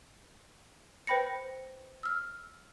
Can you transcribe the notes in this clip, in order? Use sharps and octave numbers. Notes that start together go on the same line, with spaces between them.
B4 C5 G5 B5 A#6 C#7
E6 F6